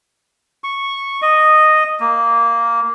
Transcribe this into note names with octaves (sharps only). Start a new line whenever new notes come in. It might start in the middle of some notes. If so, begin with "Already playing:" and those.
C#6
D#5
A#3